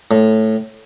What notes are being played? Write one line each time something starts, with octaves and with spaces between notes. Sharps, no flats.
A2